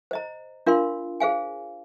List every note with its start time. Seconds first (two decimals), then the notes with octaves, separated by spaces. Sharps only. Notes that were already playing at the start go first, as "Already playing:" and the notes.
0.11 C5 D#5 A#5
0.66 D4 F4 A#4 F5 C6
1.20 G#4 C5 F5 G#5